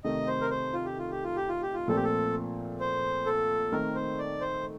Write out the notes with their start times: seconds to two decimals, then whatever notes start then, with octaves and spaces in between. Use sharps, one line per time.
0.04 C3 D#3 A3 D#4 D#5
0.27 C5
0.41 A#4
0.50 C5
0.73 F4
0.85 G4
0.98 F4
1.11 G4
1.24 F4
1.36 G4
1.49 F4
1.62 G4
1.74 F4
1.88 A#2 F3 A3 C4 A4
1.96 G4
2.04 A4
2.80 C5
3.26 A4
3.72 D#3 A3 C4 A#4
3.95 C5
4.18 D5
4.41 C5